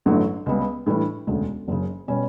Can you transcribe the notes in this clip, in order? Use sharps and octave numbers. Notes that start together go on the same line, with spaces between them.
A1 G2 D3 F#3 A3
C#2 C#3 G3 B3
A2 E3 G3 D4
E1 D2 C#3
F#1 F#2 C#3
B2 G3 C#4